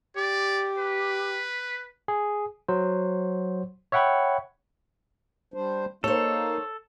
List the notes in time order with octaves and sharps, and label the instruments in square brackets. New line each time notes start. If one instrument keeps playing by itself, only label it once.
[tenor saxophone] G4 [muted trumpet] D5
[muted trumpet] B4
[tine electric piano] G#4
F#3 C5
C#5 E5 F#5 G5 B5 C#6
[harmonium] G3 D4 C5
[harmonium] A#3 D#4 [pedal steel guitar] A4 [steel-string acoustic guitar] C5 C#5